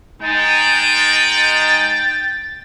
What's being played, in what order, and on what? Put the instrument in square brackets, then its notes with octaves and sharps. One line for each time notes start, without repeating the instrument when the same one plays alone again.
[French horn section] G#3 D#4 [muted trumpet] G5 [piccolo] A6